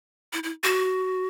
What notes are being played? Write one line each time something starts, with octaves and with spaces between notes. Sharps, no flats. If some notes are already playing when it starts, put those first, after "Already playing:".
E4
E4
F#4